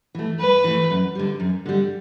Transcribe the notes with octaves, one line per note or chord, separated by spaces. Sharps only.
E3 A3
G2 B4
E3 A3
F#2
D3 G3
F#2
D3 G3